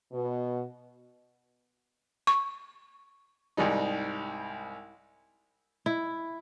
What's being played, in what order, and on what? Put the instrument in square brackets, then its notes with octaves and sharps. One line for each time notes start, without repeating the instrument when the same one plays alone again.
[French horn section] B2
[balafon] C#6
[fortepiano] C2 G#2 G3 D#4
[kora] E4